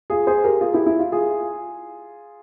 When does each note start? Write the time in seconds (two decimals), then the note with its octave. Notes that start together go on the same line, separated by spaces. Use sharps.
0.10 F4 G#4
0.27 G#4 C5
0.44 G4 A#4
0.61 F4 G#4
0.73 E4 G4
0.86 E4
0.99 F4
1.12 F4 G#4